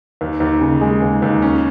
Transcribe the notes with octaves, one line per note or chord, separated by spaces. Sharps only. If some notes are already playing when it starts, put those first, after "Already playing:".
D#2
D#2
C#3
G#3
D#2
D#2
C#4